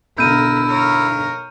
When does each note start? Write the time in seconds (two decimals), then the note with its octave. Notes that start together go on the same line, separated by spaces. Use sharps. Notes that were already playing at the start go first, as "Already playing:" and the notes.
0.18 B1 D3 E4 A#4 E6 G6 D#7
0.67 A#4 C#5